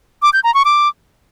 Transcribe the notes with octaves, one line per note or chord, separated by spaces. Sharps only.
D6
G6
A#5
C#6
D6